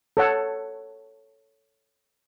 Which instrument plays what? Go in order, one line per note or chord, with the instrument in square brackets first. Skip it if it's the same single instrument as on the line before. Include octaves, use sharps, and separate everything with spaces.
[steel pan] A4 C#5 F#5